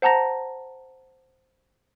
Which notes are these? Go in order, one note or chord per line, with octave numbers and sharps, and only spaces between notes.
C5 F#5 A5 A#5 A#6